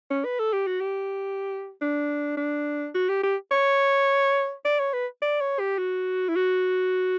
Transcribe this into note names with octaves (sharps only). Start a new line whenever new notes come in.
C#4
B4
A4
G4
F#4
G4
D4
D4
F#4
G4
G4
C#5
D5
C#5
B4
D5
C#5
G4
F#4
E4
F#4